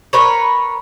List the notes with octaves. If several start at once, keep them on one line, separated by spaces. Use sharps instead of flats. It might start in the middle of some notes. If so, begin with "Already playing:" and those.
A#4 B4 C#5